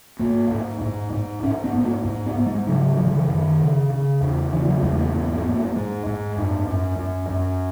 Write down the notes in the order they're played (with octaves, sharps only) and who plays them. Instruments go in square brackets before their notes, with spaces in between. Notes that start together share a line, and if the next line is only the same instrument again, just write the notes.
[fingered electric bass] G#2 A#3
G#2
G#2
G#2
G#2 C#4
B3
G#2
A#3
G#2
B3
G#2
G#3
C#3 F#3
C#3 F#3
E3
D#3
E3
F#2 D#3
C#3
C#3
E2
C#3 E3
F#3
E2 G#3
A#3
G#2 B3
B3
G#2
A#3
G#2 G#3
G#2
F#2
F#2
F#2
F#2